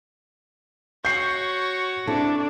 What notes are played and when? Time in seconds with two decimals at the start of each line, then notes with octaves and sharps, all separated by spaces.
1.05 F#4 C#5 G6 C7
2.07 C4 D4 E4 A4